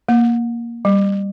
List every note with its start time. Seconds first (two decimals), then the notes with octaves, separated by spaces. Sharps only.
0.09 A#3
0.85 G3